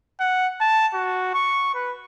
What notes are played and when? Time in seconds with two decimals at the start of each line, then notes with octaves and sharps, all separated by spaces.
0.20 F#5
0.61 A5
0.94 F#4
1.34 C#6
1.75 B4